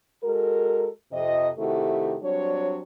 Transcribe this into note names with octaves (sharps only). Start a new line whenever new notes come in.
G#3 F#4 A4 A#4
F2 C3 D#5
C3 D#3 A3 E4 F#4 G4
F#3 G3 C4 D4 C#5